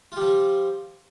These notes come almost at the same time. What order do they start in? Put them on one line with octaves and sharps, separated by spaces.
F4 G3 F3